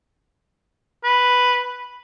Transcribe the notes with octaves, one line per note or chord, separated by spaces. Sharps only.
B4